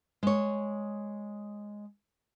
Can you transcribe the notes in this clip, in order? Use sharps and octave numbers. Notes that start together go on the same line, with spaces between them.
G#3 C#5